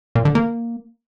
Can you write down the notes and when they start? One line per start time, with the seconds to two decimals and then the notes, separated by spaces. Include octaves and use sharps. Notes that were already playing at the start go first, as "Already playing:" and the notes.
0.15 A#2
0.25 D3
0.35 A#3